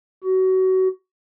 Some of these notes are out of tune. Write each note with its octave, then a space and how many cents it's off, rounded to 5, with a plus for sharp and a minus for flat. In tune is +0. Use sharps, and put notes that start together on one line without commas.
F#4 +25